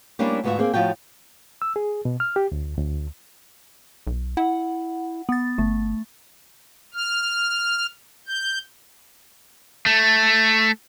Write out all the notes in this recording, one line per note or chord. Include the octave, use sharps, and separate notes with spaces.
G3 A#3 C#4 D4 E4
D2 G#2 B3 F4 F#4 E5
A#3 C4 G#4
A2 F3 F4 F#4 G5
E6
G#4
B2
F6
G4
D2
D2
B1
E4 F#5
B3 A6
G1 A3
F6
G6
A3